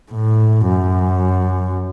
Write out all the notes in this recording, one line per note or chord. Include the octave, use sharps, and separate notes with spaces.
A2
F#2